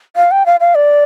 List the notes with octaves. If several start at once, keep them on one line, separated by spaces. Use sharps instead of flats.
F5
G5
F5
F5
D5